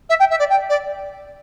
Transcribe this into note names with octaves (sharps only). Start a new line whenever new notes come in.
E5
G5
E5
D5
G5
D5